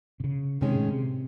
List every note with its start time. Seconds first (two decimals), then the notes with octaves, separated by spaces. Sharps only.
0.20 C3
0.24 C#3
0.61 C3 D#3 G#3 C#4
0.75 A2
0.88 C3